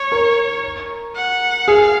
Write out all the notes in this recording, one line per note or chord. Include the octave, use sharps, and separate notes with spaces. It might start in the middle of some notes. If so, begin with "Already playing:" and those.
Already playing: C#5
A#4
F#5
G#4 F5